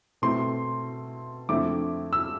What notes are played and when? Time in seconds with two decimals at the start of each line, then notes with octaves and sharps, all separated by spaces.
0.22 B2 A3 C4 E4 C6
1.49 F2 D3 A3 C4 E4 D6
2.13 E6